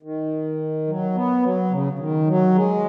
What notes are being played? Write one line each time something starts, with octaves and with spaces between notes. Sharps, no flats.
D#3
F#3
B3
F#3
C#3
C#3
D#3
F#3
G#3